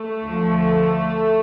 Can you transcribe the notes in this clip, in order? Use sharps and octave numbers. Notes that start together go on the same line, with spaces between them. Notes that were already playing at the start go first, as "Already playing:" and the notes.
Already playing: A3
D2 D3 F3